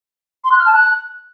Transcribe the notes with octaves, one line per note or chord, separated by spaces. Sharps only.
C6
F#6
F6
A5
F#6